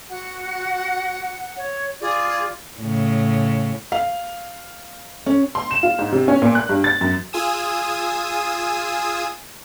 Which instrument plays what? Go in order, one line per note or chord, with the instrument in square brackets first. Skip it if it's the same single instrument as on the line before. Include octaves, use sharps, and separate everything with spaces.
[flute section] F#4 [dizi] F#5
[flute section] C#5
[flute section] F4 D5 D6 [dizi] G#4
[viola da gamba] A2 C#3
[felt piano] F5
C#4
[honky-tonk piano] C6
E7
F4
G#2
C3
C#4
A#2
F#6
G2
A6
F#2
[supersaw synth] F4 G#4 G#5 D#6 E6